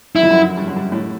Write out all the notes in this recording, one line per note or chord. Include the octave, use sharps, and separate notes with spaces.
F#2 E4
F2
F#2
G2
F#2
G2
A2